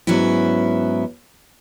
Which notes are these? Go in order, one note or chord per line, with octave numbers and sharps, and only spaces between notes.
G#2 F#3 B3 C#4 E4